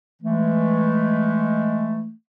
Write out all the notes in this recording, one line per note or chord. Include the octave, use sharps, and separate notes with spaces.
E3 G#3 A3